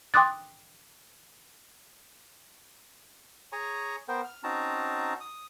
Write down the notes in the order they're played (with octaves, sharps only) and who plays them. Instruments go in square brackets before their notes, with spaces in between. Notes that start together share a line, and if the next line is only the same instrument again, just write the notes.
[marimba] G5 C6 D6 D#6 F#6 A6
[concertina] G#4 C#5 G#5 A#5 C#6
B3 A#4 C5 G5
F6
C4 C#4 D#4 F#4 A5 A#5
D#6